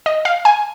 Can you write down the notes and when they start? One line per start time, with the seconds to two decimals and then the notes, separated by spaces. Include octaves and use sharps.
0.06 D#5
0.25 F5
0.45 G#5